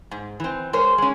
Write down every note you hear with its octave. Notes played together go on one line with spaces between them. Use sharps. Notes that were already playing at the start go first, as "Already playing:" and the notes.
G#2
E3 C4
G#3 A#4 C5 C#5
G#3 C#4